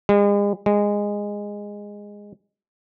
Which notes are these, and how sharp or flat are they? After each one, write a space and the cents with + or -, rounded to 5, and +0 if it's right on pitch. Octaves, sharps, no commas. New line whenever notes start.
G#3 -40
G#3 -15